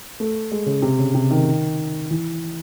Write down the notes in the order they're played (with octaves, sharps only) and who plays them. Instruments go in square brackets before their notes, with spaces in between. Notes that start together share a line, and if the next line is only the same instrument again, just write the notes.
[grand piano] A3
G#3
C#3
C3
C#3
C3
D#3
E3